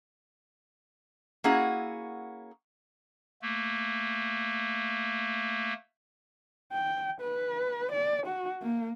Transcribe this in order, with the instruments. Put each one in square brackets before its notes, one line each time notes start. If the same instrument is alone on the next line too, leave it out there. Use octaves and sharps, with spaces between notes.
[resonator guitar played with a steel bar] A#3 C#4 E4 F#4 G#4 F#5
[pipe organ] A3 A#3
[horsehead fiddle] G5
B4
D5
F#4
A#3